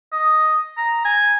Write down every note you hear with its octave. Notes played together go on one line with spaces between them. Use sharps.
D#5
A#5
G#5